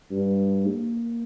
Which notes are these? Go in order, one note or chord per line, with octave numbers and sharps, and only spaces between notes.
G2
A#3